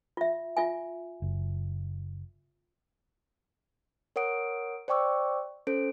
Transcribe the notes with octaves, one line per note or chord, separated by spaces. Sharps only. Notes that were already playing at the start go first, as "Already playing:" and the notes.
F4 E5
F4 E5 G#5
F#1
A#4 C#5 F#5 D#6 D7
C5 D5 G5 C#6 D6 E6
C#4 A4 C5 D7